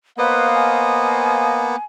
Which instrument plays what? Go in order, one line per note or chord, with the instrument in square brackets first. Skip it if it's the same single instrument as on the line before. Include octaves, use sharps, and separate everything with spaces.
[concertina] A#3 B3 [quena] B4 [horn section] C5 D#5 F5
[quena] G#5